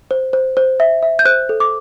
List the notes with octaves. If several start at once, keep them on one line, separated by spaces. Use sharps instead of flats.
C5
C5
C5
E5
E5
G6
C5 F#6
A4
D6